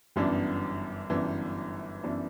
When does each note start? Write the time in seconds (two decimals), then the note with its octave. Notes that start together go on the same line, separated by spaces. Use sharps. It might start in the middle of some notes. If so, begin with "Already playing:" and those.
0.16 G1 F#2 E3 B3 D4
1.10 G1 F#2 E3 B3 D4
2.03 F#2 E3 B3 D4